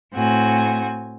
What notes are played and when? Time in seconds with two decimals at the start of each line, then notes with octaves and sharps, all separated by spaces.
0.13 A2 C4 F#4 G#5